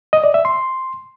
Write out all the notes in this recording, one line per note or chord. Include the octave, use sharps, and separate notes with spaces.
D#5
D5
E5
C6